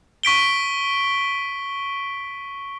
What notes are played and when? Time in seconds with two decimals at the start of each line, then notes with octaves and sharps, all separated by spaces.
0.23 C#6 B6 D7 G7